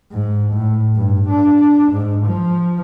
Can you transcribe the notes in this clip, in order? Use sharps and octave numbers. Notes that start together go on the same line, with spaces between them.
G#2
A2
G2
D4
G#2
F3